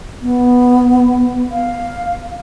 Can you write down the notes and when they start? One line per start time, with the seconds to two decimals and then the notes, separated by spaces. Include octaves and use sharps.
0.22 B3
1.51 F5